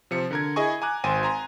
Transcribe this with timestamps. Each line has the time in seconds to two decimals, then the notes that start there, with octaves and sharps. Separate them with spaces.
0.11 C3 F3 C#7
0.31 D3 A#4 G#6
0.56 E4 G#4 D#5 G#5 C#6
0.82 G#5 A#5 D6 F#6
1.04 G#1 C5 G5 G#5 D#7
1.23 G#5 A#5 C6